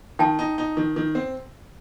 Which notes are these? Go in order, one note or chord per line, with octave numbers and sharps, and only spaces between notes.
D#3 G5 A5
D#4
D#4
D#3
D#3
C4